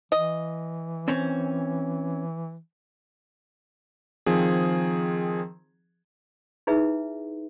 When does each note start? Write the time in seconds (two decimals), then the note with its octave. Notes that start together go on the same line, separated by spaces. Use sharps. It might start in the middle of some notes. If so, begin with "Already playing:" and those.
0.12 E3 D#5
1.08 C4 C#4
4.26 D#3 F3 C4 G#4
6.67 D#4 E4 G#4 B4 E5